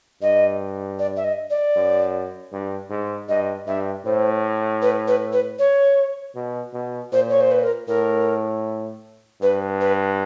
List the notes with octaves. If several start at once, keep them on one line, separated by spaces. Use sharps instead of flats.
G2 D#5
D5
E5
D#5
D5
F#2
G2
G#2
G2 D#5
G2 E5
A2 C5
B4
B4
B4
C#5
B2
B2
A#2 C5
C#5
C5
B4
A#4
A2 A#4
G2 B4
B4